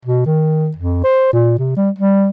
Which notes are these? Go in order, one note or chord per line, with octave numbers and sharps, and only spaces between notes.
B2
D#3
F2
C5
A#2
C3
G3
G3